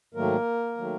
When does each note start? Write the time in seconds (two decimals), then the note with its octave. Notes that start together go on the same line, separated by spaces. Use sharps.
0.14 G#2 D#3 F#3 A3 A#3 A#4
0.77 D#3 F#3 A3